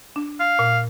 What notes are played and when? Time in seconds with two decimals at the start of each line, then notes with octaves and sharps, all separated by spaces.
0.16 D4
0.40 F5
0.59 A#2